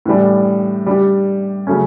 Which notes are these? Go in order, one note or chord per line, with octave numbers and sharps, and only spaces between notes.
A2 E3 G3 D4
G3 D4 G4
C#3 F#3 A3 C#4